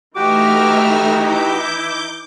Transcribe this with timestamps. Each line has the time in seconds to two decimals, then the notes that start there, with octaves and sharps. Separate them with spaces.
0.16 E3 A3 D#4 F#4 G4 E5 D6 F6
1.16 E4 D6 G6